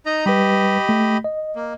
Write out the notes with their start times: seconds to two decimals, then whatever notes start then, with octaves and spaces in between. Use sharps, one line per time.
0.06 D#4 D#5 A#5
0.26 G3 G4 B4 D#5 B5
0.89 A3
1.24 D#5
1.56 A#3